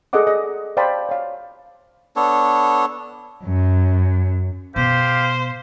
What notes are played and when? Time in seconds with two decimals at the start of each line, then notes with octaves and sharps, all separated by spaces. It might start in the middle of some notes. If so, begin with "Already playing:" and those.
0.13 G#4 A4 D5 D#5 F#5 D6
0.27 D#5
0.77 C5 D5 F5 G5 A5 B5
1.09 C#5 F5
2.16 B3 D4 A4 C#5
3.44 F#2
4.76 B2 G4 C5 F5